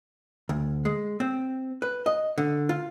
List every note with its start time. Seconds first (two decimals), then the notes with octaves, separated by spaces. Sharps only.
0.49 D2
0.85 G#3
1.20 C4
1.82 B4
2.06 D#5
2.38 D3
2.69 F4